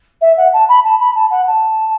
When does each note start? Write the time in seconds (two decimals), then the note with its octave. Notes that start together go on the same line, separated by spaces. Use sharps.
0.21 E5
0.37 F#5
0.53 A5
0.68 B5
0.84 A5
1.00 B5
1.15 A5
1.30 F#5
1.47 A5